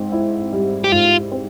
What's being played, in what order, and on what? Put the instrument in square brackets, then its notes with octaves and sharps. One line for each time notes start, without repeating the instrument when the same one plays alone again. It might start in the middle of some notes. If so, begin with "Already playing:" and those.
Already playing: [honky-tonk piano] G#2 C4
E4
G3
[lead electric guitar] G4
[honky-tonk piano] G#2 [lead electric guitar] F4
[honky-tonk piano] C4